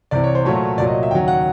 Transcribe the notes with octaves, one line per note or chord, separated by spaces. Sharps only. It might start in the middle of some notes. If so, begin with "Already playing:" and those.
C2 C3 E3 D5
C#5
C5
A#2 F#3 A3 C#5
C2 A#2 F#3 D5
D#5
E5
D#2 C#3 F#3 G5
F#5